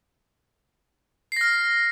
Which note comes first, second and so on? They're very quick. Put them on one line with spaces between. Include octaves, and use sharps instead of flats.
C7 A#6 F6